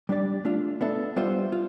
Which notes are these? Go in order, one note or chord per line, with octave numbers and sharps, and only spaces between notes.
G3 D4 G4 D5
A3 D4 F4
B3 D4 A4 E5
G3 B3 F4 C5 E5
F4